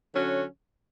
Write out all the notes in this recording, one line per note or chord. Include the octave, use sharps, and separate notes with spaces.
D3 F#3 C#4 F#4